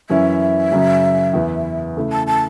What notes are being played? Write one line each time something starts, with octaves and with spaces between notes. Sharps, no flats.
F#2 E3 C#4 E4 E5
F#2 C#3 F#3 C#4
E2 E3 B3 E4
C#3 A3 E4
A5
A5